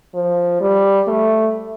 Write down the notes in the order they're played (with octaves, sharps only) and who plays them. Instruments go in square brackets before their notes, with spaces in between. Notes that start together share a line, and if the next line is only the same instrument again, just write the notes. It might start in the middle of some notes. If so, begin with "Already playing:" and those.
[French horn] F3
G3
A3